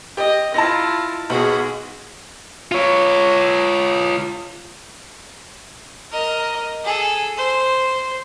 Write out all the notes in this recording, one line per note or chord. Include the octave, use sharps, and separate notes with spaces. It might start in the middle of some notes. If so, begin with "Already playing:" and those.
G4 D#5
E4 F4 A5 A#6
B1 F#4 G#4
F4 C#5
A#4 D#5
G#4 A4
C5